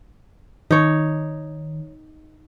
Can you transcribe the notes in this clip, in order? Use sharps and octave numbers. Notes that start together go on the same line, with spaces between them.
D#3 D#4 C#5